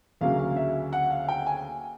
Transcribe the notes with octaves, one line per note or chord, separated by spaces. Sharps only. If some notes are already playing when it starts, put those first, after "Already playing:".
D2 C#3 F#3 A#3 C#4 F5
F5
E5
F#5
F5
G5
G#5